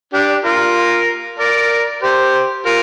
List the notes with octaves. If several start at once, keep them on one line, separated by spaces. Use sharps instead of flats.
D4 G4
F4 A#4
A#4 D5
G4 C5
F4 A#4